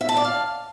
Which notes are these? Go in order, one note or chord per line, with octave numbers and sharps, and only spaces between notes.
E5
A5
D5
F5